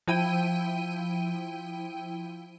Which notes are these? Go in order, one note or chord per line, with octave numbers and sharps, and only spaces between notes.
F3 E4 G5 D#7